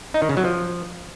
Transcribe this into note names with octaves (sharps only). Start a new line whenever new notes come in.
D#4
D#3
C#3
F#3
F3